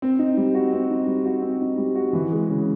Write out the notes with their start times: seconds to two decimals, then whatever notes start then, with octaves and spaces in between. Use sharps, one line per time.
0.02 C4
0.19 D#4
0.37 G3
0.55 F#4
0.73 C4
0.90 D#4
1.07 G3
1.25 F#4
1.42 C4
1.61 D#4
1.78 G3
1.95 F#4
2.13 E3
2.32 G#3
2.49 C#3